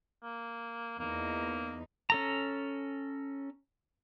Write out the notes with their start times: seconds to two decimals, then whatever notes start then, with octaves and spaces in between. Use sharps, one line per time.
0.23 A#3
0.99 E2 A#3 D#4
2.10 C#4 A4 A#5